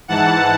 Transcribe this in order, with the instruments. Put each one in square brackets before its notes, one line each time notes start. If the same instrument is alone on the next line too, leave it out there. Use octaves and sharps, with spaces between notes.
[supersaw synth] G#2 E3 F#5 A5